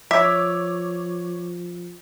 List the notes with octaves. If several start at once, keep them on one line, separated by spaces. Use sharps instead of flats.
F3 C#5 E5 D6